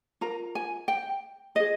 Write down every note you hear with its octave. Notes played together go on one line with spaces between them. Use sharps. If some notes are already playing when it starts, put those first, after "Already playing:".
F4 A#4 A#5
G#5
G5
F4 G#4 D#5